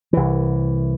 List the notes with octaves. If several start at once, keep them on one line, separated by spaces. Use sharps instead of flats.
C2 E3